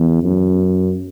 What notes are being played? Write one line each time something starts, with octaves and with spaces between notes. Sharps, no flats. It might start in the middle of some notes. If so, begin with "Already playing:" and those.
Already playing: E2
F#2